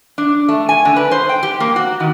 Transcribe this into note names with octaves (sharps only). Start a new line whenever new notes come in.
D4
A3
G#5
D3
B4
C5
G5
G4
A#3
F#4
D#3